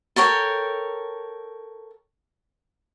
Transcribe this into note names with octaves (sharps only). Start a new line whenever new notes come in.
A4 A#4 C#5 G5